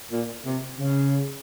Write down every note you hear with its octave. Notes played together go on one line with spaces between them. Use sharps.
A#2
C3
C#3